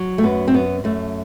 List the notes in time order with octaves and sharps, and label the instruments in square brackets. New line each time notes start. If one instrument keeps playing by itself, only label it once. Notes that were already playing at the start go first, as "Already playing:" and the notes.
Already playing: [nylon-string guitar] F#3
A3
F#2 B3
C4
F#2 B3
F#2 A3